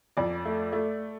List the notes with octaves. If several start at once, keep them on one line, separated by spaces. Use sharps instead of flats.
F2 D5
A3
A3